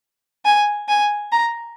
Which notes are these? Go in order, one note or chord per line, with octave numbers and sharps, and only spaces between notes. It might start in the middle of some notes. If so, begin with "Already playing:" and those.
G#5
G#5
A#5